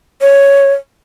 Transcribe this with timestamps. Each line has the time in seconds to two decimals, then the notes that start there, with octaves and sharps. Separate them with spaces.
0.21 C#5